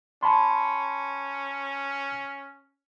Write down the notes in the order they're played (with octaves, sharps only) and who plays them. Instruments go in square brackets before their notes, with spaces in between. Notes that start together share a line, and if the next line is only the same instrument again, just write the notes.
[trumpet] C#4 [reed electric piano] A5 B5 C6